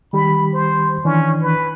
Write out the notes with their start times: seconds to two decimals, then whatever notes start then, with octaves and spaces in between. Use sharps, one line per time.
0.13 D#3 G3 G4 B5
0.54 C5
1.05 D#3 E3 C#4 D4
1.42 B4